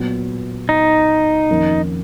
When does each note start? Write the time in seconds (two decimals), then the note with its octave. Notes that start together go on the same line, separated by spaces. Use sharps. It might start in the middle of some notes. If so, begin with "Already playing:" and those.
Already playing: A#2 F#3 B3
0.69 D#4
1.49 F2 D#3 A#3 C#4